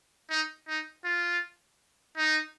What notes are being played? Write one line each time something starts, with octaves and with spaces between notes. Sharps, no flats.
D#4
D#4
F4
D#4